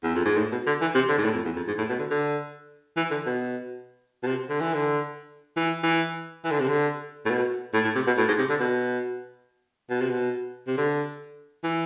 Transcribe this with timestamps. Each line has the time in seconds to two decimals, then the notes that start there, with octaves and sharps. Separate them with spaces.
0.04 E2
0.15 F2
0.25 G#2
0.37 A2
0.52 B2
0.67 D3
0.81 E3
0.95 C3
1.09 D3
1.18 G#2
1.24 A2
1.34 F2
1.45 E2
1.56 F2
1.67 G#2
1.78 A2
1.89 B2
1.99 D3
2.10 D3
2.97 E3
3.11 D3
3.26 B2
4.23 B2
4.27 C3
4.49 D3
4.61 E3
4.74 D3
5.57 E3
5.83 E3
6.44 E3
6.51 D3
6.60 C3
6.69 D3
7.25 A2
7.30 B2
7.74 A2
7.85 A2
7.95 C3
8.07 B2
8.18 A2
8.28 G#2
8.38 C3
8.50 D3
8.60 B2
9.90 B2
10.01 C3
10.10 B2
10.67 C3
10.77 D3
11.63 E3